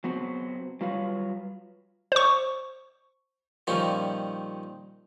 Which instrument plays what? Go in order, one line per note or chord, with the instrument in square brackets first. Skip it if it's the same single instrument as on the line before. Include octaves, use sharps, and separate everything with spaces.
[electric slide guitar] F#3 B3 C4 F#4
F#3 G3 F4 B4 C#5 F5
[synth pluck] C5 C#6
[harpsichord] A#2 D#3 F3 G3 C#4 D#4